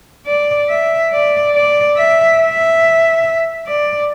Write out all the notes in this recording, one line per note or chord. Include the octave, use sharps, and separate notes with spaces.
D5
E5
D5
D5
E5
E5
D5